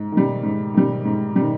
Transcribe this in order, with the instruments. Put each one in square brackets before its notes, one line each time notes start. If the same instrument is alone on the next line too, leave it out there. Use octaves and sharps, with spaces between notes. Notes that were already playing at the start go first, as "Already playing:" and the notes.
Already playing: [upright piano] G#2
D#3 G3
G#2
D#3 G3
G#2
G3
D#3